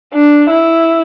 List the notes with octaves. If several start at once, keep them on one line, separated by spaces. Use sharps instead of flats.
D4
E4